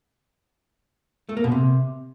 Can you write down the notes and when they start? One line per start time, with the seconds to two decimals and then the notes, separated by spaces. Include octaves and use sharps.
1.29 A3
1.37 A#3
1.44 B2
1.52 C3